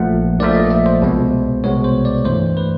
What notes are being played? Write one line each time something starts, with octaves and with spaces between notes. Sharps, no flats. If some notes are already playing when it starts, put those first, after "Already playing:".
Already playing: A#1 A#2 F3 A3 F#5
A#1 A#2 F3 A3 D5
D#5
E5
C5
C2 B2 G#3 B3
C2 B2 G#3 B3 C#5
C5
D5
G2 E3 A3 C5
B4